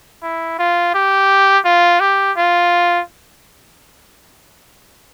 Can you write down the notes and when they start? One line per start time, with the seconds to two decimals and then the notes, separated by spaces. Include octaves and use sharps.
0.22 E4
0.59 F4
0.94 G4
1.65 F4
2.00 G4
2.37 F4